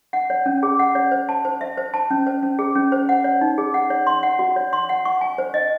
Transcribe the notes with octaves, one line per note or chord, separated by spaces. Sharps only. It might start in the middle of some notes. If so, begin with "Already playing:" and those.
F#5
C#5
C#4
G#4
F#5
C#5
C5
A5
C5
E5
C5
A5
C#4
C5
C#4
G#4
C#4
C5
F#5
C#5
D#4
G#4
F#5
C#5
C6
F#5
F#4
C#5
C6
F#5
C#6
G#5
C5
D#5